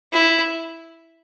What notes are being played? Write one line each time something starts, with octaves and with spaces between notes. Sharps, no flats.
E4